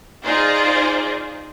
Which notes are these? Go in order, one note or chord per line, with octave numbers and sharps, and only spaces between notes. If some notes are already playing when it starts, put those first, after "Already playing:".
D#4 F4 G#4 C5 D5